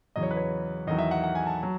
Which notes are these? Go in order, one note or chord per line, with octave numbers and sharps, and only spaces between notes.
E2 C#3 F#3 D#5
C#5
B4
C#5
E2 D#3 F#3 D#5
E5
F#5
F#5
G#5
A5
F#3